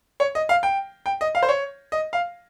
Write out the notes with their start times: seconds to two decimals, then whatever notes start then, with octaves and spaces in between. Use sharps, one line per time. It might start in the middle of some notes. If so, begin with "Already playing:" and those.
0.20 C#5
0.35 D#5
0.49 F5
0.63 G5
1.06 G5
1.21 D#5
1.35 F5
1.43 C5
1.49 C#5
1.92 D#5
2.13 F5